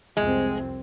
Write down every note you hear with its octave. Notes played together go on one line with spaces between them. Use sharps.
C2 F2 G#3 C4